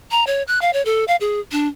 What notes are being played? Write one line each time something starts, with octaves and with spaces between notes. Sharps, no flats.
A#5
C#5
F#6
F5
C#5
A4
F5
G#4
D4